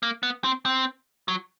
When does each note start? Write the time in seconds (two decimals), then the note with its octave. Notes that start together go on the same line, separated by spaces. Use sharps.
0.03 A#3
0.23 B3
0.44 C4
0.65 C4
1.28 F#3